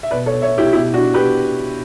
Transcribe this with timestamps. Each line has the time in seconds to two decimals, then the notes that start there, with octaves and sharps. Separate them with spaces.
0.03 E5
0.11 B2 B4 D5
0.26 A4 C#5
0.42 C#5 E5
0.58 E4 G4
0.73 B2 E4 G4
0.93 D4 F#4
1.14 G4 B4